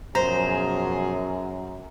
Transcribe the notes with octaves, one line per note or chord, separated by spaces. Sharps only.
F#2 B2 F3 G#4 C5 A#5